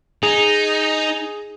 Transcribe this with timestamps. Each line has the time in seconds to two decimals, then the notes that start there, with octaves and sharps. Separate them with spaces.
0.23 D#4 G#4